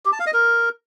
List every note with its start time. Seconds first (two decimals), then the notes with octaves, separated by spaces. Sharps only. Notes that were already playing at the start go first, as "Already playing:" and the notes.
0.05 G4
0.12 A5
0.20 F5
0.27 D#5
0.34 A#4